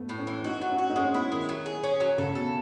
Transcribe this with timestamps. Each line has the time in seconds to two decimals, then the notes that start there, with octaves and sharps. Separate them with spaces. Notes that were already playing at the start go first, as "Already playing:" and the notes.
Already playing: A3 B3
0.09 A2
0.19 C#4
0.27 E3
0.44 D#4 F#4
0.62 F#3
0.70 C#4
0.78 F#4
0.90 D#4
0.96 G#3 C#4
1.14 B3 E4
1.31 D#3 G#3
1.49 F#3
1.66 G#4
1.84 C#4
2.00 F#3
2.18 C#3 A4
2.35 B2 A4